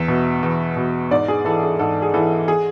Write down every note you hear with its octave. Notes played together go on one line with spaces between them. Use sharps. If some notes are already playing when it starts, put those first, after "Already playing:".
Already playing: E2 E5
B2
E2
B2
G#2 D5
G#4
E3 A4
G#4
G#2 A4
G#4
E3 A4
G#4